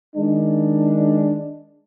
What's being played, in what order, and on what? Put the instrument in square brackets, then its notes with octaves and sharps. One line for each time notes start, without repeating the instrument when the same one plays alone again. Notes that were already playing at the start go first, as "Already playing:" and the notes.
[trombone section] D#3 G#3 D4